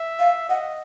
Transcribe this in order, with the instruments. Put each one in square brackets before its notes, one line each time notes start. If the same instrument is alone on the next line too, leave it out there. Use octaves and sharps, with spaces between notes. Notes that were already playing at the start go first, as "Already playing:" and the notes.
Already playing: [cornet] E5
[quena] F5
[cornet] D#5 [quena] F#5